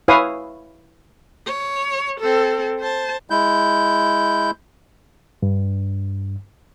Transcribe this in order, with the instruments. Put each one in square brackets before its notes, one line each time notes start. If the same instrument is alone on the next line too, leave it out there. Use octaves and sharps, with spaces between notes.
[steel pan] E4 B4 C#5 F5 G#5 D#6
[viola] C#5
C4 A4
C5 A5
[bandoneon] G#3 E4 G6
[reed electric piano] G2